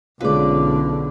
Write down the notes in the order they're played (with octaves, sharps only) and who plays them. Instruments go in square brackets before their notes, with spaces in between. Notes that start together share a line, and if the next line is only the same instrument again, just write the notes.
[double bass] B1 D3 [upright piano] G#3 C#4 F4 [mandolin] B4 D5